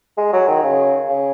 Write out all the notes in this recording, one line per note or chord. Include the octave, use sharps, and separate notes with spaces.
G#3
F#3
D#3
C#3
C#3